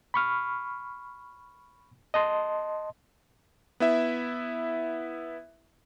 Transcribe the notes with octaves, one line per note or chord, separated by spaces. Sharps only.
B5 C#6 F6
D#5 A5 C6
B3 E4 E5